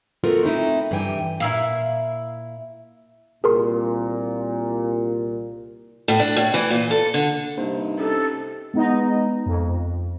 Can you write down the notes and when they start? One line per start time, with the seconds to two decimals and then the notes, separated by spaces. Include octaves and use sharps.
0.24 A3 B3 F4 F#4 A4 A#4
0.43 A3 C4 D#4 E4
0.91 G2 E3 G4 G5 G#5
1.40 A#2 E4 F5
3.44 C2 A#2 G#4 A#4 C6
6.08 A2
6.20 D4
6.36 A2
6.54 E3
6.70 A#2
6.91 A4
7.14 D3
7.57 G2 C3 A#3 D#4 C5
7.99 C#4 G4 A4 C5
8.74 G#3 B3 D#4 D#5
9.46 F2